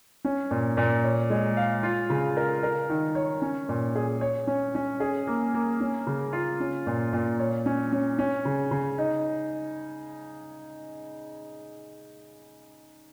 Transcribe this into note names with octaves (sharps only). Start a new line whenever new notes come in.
C#4
A#2
A#2
C#5
G#3
F5
F4
C#3
A#4
A#4
D#3
C#5
C#4
A#2
G#4
C#5
C#4
C#4
G#4
A#3
A#3
C#4
C#3
F4
C#4
A#2
A#2
C#5
C#4
C#4
C#4
C#3
C#3
D#4